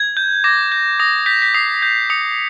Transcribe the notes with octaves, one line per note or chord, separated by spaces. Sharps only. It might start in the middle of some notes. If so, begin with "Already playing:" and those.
Already playing: G#6
G6
D6 A#6
G6
D#6 A#6
G6 B6
B6
D#6 C7
G6
D#6 C#7